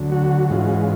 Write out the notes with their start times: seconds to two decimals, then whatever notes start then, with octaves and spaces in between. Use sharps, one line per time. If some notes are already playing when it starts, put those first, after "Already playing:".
Already playing: D2 D3 F#3
0.12 F#4
0.49 G#2 E3 G#3 C#4 F4 F#4